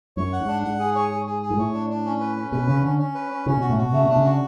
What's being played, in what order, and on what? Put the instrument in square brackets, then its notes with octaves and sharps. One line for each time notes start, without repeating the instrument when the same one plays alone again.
[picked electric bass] F#2 [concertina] C#5
[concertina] F#5
[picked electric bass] G#2
[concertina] D4
[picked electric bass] G#2 [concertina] F#5
[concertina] G#4
C#5
G#4
G#4
G#4
[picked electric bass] G#2
[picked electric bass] A2 [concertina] C#5
[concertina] D4
D4
C#4
B4
C#4
[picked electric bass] B2 [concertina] B4
[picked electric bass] C#3 [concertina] C#4
[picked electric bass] D3 [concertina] C#4
[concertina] C#4
B4
C#4
[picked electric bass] C#3 [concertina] C#4
[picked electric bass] B2 [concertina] F#4
[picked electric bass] A2
[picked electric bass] B2 [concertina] F#4
[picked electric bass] C#3 [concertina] A3
[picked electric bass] B2 [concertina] D4
[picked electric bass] C#3
[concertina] F#4